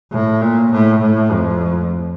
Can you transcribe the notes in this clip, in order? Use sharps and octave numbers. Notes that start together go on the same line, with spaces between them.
A2
A#2
A2
A2
F2